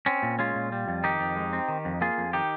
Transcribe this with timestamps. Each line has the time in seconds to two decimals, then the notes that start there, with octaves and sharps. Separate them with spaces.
0.06 C4 C#4
0.23 A#2
0.39 G#3 C#4 F4
0.55 A#2
0.72 G3
0.88 F2
1.04 D#3 D#4 G4
1.20 F2
1.36 G#3
1.53 C4
1.68 D#3
1.85 F2
2.01 A#3 F4 G#4
2.18 F2
2.33 D#3 D#4 G4